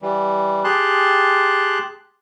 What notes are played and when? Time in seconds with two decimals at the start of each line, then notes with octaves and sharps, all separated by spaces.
0.02 E3 G3
0.64 G4 G#4 A5 C6 F#6